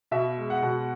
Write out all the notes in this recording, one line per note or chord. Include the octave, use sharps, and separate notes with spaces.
B2 E5
G#3
F#5
B2